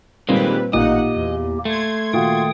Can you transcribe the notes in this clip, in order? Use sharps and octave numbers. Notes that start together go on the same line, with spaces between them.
A#2 D#3 G3 G#3 A#3 C4 B4
A1 A#2 A#3 D#4 G4 D#5 F#5
E2
A3 C6 G#6
A#2 D#3 F4 F#4 G5 D#6